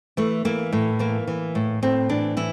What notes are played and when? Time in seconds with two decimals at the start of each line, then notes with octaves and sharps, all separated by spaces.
0.17 E3 A3
0.45 E3 A#3
0.73 A2
0.99 E3 A#3
1.28 E3
1.55 A2
1.82 A2 C4
2.09 E3 D4
2.37 E3 E4